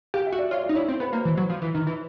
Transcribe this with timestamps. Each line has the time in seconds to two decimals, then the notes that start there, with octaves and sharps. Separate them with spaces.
0.14 G4 F5
0.27 E5
0.32 F#4
0.39 D5
0.51 F4 C#5
0.63 D5
0.69 D#4
0.75 E4 C#5
0.88 C4 C5
1.00 B3 B4
1.12 A#3 C5
1.25 E3
1.37 F#3
1.50 F3
1.62 E3
1.74 D#3
1.87 E3